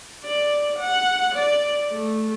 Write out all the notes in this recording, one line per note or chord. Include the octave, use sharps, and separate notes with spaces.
D5
F#5
D5
A3